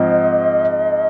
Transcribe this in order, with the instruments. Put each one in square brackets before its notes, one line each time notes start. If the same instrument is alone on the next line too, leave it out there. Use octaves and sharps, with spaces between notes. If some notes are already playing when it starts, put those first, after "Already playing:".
Already playing: [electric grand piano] G#2 F3 C4 [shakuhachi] D#5